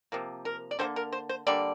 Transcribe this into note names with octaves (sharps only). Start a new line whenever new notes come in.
C3 F3 A#3
A#4
D5
D3 G3 A#3 C5
A#4
C5
C5
D3 G3 A#3 D5